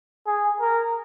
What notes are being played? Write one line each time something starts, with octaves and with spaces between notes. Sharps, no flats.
G#4
A#4